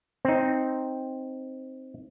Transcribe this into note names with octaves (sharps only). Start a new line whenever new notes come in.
C4 D#4